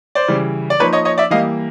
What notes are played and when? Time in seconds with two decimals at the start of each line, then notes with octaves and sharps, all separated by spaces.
0.15 C5 D5
0.28 C#3 E3 G3
0.70 D5
0.80 F3 A#3 D#4 B4 C#5
0.93 C#5 D#5
1.05 C#5 D#5
1.18 D5 E5
1.30 E3 G3 A#3 D#5 F5